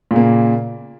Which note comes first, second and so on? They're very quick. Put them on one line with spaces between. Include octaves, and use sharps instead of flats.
A#2 C#3 A#3